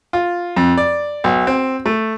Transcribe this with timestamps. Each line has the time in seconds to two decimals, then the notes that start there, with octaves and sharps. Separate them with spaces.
0.13 F4
0.56 F2
0.77 D5
1.24 B1
1.47 C4
1.86 A3